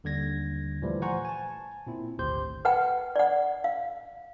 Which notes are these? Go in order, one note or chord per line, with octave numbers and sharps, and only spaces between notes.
D#2 D3 G3 G#6 A#6
A#2 E3 F3 G3 A3
C5 F#5 G#5 A#5 C#6
G#5 A5
A#2 C4 E4
G#1 D2 G4 C5 C6 G6
B4 F#5 G5
D5 F#5
F5